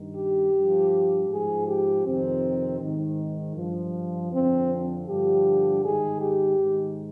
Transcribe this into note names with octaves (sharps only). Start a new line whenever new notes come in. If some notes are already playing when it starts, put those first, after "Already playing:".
Already playing: G2 D#3
G4
G2 F3
G#2 F3 G#4
G4
F2 C3 D#3 C4
G#2 D#3
G2 F3
F2 D3 F3 C4
G2 D3 F3 G4
G#2 D#3 G#4
G4
G#2 D#3